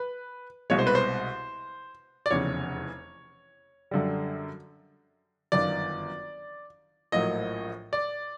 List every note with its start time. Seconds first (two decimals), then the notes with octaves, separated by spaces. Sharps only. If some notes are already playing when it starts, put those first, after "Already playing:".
Already playing: B4
0.70 C2 B2 G#3 C#5
0.79 C5
0.87 B4
0.95 C5
2.26 D5
2.30 F1 E2 C#3 C#5
3.91 F#2 D3 G3
5.52 G1 F#2 D#3 D5
7.12 A#1 A2 F#3 A#3 D#5
7.93 D5